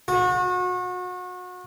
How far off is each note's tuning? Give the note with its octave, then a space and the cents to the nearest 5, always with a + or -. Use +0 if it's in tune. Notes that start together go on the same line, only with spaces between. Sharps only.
F#4 -35